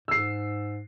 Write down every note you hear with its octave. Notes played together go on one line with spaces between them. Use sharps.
G#2 E6 C7